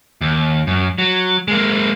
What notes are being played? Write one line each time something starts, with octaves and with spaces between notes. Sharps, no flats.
D#2
F#2
F#3
G#3 A#3